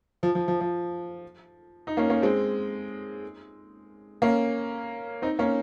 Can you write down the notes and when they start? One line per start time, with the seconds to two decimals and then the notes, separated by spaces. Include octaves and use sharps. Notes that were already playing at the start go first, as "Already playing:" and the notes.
0.23 F3
0.35 F3
0.48 F3
0.61 F3
1.87 D#4
1.97 A#3 C#4
2.10 A#3 C#4
2.22 G#3 C4
4.22 A#3 C#4
5.22 C4 D#4
5.39 A#3 C#4